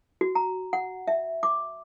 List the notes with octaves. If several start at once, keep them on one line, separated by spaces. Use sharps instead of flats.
F#4
A#5
F#5
E5
D6